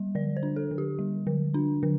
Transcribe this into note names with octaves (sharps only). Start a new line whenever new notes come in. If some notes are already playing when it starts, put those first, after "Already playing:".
Already playing: G3
D3 D5
C5
D4
A4
D3
G4
G3
D3
D4
D3